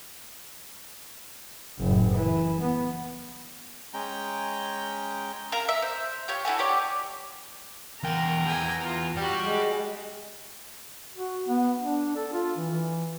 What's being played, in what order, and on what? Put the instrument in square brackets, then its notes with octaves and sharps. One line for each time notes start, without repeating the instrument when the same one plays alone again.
[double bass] F#1 A2
E3
B3
[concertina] G#3 C#4 G5 A#5
[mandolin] A#4 F5 A#5
E5
C5
F4 G4 C#5
E4 F#4 A4 G#5
G4 C#5 D5
[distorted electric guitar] E2 G5 [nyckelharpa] A#4 F#5 [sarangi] A#5
[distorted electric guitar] E2 [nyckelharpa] G5 G#5
[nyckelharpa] F4
[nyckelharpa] F#4 G4 [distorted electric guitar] D5 G5
[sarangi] G#3
[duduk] F#4
B3
D4
A4
F4
E3
E3